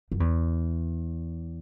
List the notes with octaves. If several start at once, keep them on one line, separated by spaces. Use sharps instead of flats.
F#2
E2